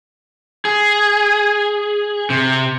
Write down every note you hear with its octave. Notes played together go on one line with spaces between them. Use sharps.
G#4
C3